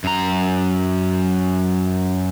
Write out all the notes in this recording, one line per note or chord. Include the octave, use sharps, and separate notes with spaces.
F#2 A#5